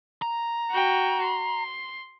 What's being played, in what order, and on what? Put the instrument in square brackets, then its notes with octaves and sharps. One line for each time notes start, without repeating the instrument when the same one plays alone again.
[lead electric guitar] A#5
[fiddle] F#4 G5
C6